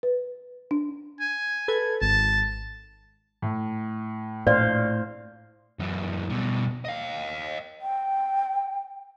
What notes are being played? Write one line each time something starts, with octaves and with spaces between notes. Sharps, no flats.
B4
D4
G#5
A4 B4 G#6
G#1 A5
A2
A#1 A2 C5 D5 F5
F#2 E3
B2 G3
D#5 F5
G5